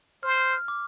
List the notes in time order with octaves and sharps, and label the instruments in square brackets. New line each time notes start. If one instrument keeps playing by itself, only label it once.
[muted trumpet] C5 [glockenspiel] F6
[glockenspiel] F6
F6
D6